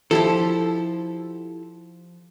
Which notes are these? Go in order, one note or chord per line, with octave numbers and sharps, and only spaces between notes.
F3 E4 G4 A4